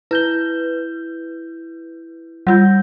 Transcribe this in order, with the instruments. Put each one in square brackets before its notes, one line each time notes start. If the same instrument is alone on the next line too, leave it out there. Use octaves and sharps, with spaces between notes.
[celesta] E4 G6 G7 [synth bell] B4
[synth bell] G3 F4 [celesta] F#5 G6